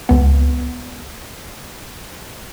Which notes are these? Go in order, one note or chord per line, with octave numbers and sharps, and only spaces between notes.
C#2 B3